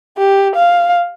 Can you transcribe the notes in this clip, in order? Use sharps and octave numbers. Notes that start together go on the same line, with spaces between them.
G4
F5